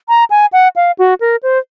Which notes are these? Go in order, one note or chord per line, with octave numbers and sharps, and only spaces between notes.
A#5
G#5
F#5
F5
F#4
A#4
C5